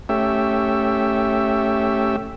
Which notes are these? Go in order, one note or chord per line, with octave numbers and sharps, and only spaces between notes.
A3 C#4 G4 E5